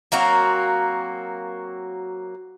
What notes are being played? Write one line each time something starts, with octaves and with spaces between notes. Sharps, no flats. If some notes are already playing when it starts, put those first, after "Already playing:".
F#3 A#3 C4 F#4